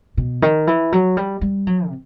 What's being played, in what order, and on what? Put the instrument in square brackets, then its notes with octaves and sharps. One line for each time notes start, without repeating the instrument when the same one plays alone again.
[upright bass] B2
D#3
E3
F#3
G3
G3
F#3
C3